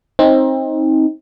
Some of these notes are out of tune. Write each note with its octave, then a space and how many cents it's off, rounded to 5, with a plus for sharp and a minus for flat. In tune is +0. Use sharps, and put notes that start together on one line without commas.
C4 +25 D#4 +20